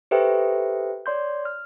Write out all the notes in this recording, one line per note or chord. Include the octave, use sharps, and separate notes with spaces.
G4 A4 B4 C5 E5 G5
C#5 D5 C6 G6
F6